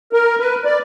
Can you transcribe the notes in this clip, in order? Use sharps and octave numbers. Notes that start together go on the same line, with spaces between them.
A#4
B4
D5